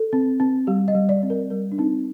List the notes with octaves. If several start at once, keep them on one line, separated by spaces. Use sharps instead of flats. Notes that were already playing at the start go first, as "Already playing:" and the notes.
Already playing: A4
C4
C4
G3 G4
D#5
G3
D5
C4
A#4
G3 A#4
D4
C4 D#4